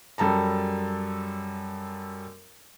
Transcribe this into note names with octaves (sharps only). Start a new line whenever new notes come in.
F#2 G3 A4 A5 A#5